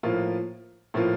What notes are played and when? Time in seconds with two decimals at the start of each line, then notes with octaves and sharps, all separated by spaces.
0.03 A2 F3 A#3 F4
0.94 A2 F3 A#3 F4